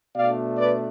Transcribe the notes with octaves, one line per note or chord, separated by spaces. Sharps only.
B2 A3 D4 D5 F5
B4 D5